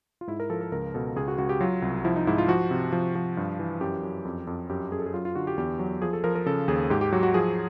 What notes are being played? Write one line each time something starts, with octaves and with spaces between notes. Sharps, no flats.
F4
G#2 E4
A#4
F3 A4
A4
C#2 A#4
B2 A4
C#2 G#4
F#4
C#2 F#4
G4
F#3 F4
C2
F3 E4
D#4
G#2 E4
F4
F3 F#4
C3
F3
F3
G2
E3
F#2 G4
F#2
F2
F2
F#2 G4
F#2 G#4
A4
G#4
F#3 F4
F4
D3 F#4
G4
E2 G4
F#3
F3 G#4
A4
F3 A#4
A#4
C#3 A4
D#2 G#4
G#2 G4
G4
F#3 F#4
F#4
F3 G#4